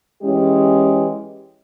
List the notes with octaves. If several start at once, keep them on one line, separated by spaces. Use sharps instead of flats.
E3 G#3 C#4 G4